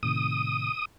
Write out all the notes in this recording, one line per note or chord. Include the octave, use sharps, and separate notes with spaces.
A2 C3 D#3 D#6